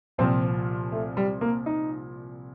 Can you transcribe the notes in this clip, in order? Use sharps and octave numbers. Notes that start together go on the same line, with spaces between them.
C2 A#2 F3 C4
A3
G3
A#3
D#4